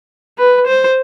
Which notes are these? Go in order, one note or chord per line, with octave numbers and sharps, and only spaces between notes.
B4
C5